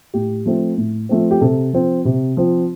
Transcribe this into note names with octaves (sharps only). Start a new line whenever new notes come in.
A2 G4
F3 A3 C4
A2
F3 A3 C4
G4
C3 A4
F3 C4
C3
F3 C4